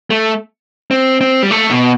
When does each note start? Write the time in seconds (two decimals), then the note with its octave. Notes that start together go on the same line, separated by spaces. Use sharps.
0.10 A3
0.91 C4
1.21 C4
1.43 G3
1.51 A3
1.71 B2